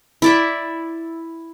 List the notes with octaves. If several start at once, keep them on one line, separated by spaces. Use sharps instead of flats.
E4 D5 E5